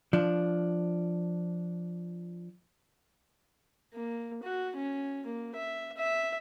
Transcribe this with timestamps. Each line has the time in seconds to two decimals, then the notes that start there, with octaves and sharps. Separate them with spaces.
0.13 F3 D4
3.94 A#3
4.43 F#4
4.76 C#4
5.26 A#3
5.55 E5
5.97 E5